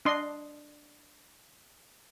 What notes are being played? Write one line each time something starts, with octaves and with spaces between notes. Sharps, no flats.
D4 D#5 C6